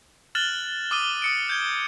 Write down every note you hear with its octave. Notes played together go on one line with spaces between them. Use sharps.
F6 F#6 A6 E7 F#7 G7
D6 D#6 F6 D#7 G7
D#6 C#7 D7
G6 G#6 G7